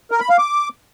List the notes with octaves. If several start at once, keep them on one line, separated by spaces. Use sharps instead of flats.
A#4
B5
F5
D6